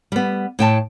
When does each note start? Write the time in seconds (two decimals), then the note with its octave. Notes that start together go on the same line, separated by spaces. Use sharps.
0.12 G3 B3
0.59 A2 G5 A5